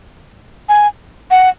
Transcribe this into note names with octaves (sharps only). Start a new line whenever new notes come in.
G#5
F#5